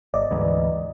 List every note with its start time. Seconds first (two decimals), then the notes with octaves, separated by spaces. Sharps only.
0.14 G1 D5 D#5
0.31 D2 G#2 E3